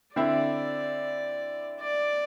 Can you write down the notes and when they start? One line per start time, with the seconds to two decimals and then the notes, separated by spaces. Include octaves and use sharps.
0.16 D3 C4 E4 D5
1.80 D5